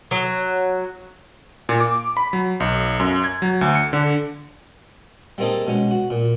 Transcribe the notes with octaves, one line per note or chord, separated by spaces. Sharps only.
F#3
A#2
D6
B5
F#3
B1
F#2
G#6
F#3
D2
C#7
D3
G3 A#3 C4 D#4 G#4 A4
B2 G#3 C#4
F#4
A#2